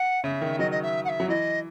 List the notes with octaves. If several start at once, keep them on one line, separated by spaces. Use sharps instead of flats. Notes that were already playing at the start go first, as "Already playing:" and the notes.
Already playing: F#5
C#3 E5
D#3
F#3 D#5
D#5
E5
F#5
E5
F#3
E3 D#5